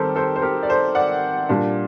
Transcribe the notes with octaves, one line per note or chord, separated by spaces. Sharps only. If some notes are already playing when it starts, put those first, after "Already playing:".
Already playing: D#3 G3 C4 G4 A4 A#4 C5
A4 C5
C5
G4 A#4
D5
A4 C5
D5 F#5
A#2 G3 D4